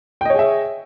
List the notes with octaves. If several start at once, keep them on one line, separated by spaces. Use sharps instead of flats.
G#4 C#5 D#5 E5 G5